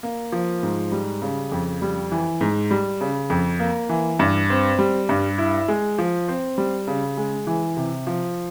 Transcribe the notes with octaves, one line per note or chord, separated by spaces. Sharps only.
A#3
F3
G#2
G3
C#3
F2
G3
E3
G#2
G3
C#3
F2
A#3
E3
G2
C4
G3
G2
E4
G#3
F3
C4
G3
C#3
G#3
E3
C3
F3